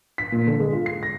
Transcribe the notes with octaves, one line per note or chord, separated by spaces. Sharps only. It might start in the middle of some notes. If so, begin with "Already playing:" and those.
B6
A#2
D3
G#3
F4
C7
A#6